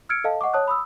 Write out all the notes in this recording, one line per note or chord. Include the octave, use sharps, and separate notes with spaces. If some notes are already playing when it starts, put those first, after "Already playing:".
E6 F6 G#6 C#7 D7
A4 D#5 F5 A5
D#5 F#5 C#6 D6
C#5 A5 D#6 F#6
B5 D#6 E6